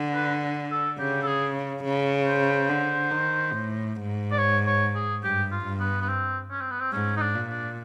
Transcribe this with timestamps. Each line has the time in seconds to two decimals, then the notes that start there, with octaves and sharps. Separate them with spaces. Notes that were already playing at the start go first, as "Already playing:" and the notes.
Already playing: D3
0.14 B4
0.71 A4
0.99 C#3 G4
1.22 A4
1.27 G#4
1.84 C#3
2.26 C5
2.68 D3
3.11 D#3
3.53 A2
3.96 G#2
4.32 D5
4.38 C#5
4.66 C#5
4.95 G#4
5.23 G2 G4
5.52 F4
5.65 G2
5.79 B3
6.01 B3
6.08 C4
6.50 C#4
6.61 C4
6.71 B3
6.80 C4
6.92 G#2 C#4
7.16 D#4
7.21 D4
7.35 A#2
7.50 D4